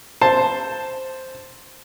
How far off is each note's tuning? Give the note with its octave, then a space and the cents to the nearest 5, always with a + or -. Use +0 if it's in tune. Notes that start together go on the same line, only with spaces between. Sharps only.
C5 +0 A5 +0